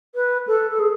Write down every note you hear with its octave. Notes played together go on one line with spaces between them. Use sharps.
B4
A4
A4
G#4